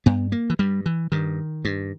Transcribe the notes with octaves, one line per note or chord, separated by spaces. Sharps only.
G2 B3
A#3
E3
G2 G3
E3
G2 D#3
G2